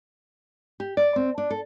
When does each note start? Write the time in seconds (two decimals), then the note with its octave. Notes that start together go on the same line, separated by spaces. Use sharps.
0.80 G4
0.97 D5
1.16 C4
1.38 D4
1.51 A4